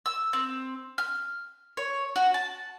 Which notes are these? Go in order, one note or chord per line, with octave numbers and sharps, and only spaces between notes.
E6
C4
F6
C#5
F#4
A5